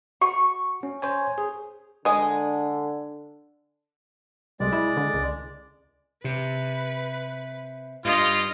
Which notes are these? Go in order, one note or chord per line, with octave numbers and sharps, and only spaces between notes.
F#4 C#6
C#4
C5 C#5 G#5
G#4
D3 G#3 D#5
C2 G#3 D5
E4
D3
C#2
C3 B4
G2 F4 D#5